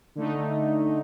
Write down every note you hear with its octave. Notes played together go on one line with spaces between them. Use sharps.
D3 A3 D#4